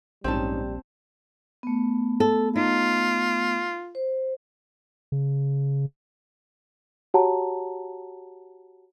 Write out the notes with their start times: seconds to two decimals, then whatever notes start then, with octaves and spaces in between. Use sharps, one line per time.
0.24 A#1 G#2 G3 C4 C#4 D#4 A5
1.63 A3 B3
2.20 A4
2.56 D#4 F4
3.95 C5
5.12 C#3
7.14 F#4 G4 C#5 F#5 A5 A#5